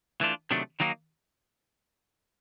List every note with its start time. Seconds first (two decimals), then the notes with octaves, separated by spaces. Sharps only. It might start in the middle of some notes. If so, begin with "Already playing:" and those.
0.21 E3 A3 D4 F4
0.51 C3 D#3 F#3 A3 D4
0.80 D#3 F#3 A#3 D#4